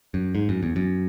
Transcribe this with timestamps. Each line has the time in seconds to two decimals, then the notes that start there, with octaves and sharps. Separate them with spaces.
0.14 F#2
0.35 G#2
0.49 F#2
0.63 E2
0.76 F#2